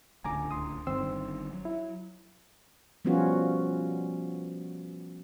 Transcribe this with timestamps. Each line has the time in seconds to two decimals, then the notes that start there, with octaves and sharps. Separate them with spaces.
0.24 D1 C#2 D3 G#5 A#5 D6
0.51 C6 D#6
0.87 G1 G2 D#3 C4 C6 E6
1.53 F#3
1.65 E4
3.05 F3 G3 B3 C#4 F4 F#4